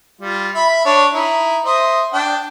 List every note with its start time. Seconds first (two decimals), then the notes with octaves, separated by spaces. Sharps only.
0.21 G3 F4
0.54 E5 B5
0.85 D4 C#5
1.14 D#4 E4
1.65 C5 D#5 E5
2.13 D4 G5